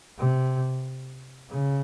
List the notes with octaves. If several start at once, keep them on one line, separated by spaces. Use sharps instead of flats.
C3
C#3